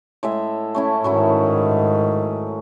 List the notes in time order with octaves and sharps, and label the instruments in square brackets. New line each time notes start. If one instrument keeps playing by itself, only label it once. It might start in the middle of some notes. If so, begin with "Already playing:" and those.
[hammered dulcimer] A2 G#3 E5
A3 C#4 E4
[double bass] G#2 D#3 [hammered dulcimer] F#3 C#4 E4